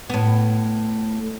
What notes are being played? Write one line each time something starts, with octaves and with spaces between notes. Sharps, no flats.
A2 B3